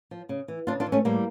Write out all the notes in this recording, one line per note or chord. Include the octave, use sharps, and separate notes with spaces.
F3
C#3
E3
C#3 D4 F4
D4 F4
E3
A3 C#4
A2 G3 A#3